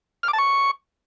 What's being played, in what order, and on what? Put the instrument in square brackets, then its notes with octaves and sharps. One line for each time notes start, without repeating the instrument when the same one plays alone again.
[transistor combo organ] F6
D6
A5
C#6